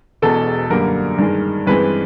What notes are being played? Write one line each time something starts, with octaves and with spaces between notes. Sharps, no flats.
E1 E2 B2 A4
F#2 D3 G3 A#3 A#4
G2 D#3 G#3
G2 E3 G#3 C4 B4